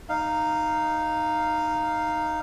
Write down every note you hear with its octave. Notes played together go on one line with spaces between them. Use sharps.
D#4 F5